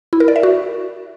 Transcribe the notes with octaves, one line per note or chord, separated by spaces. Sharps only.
E4
A#4
D5
E5
F#4